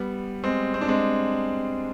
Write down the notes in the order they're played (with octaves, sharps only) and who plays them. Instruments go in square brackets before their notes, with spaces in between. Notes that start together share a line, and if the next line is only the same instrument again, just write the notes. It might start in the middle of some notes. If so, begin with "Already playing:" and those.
Already playing: [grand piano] G3 B3
G#3 C4
C4
D4
G#3 C4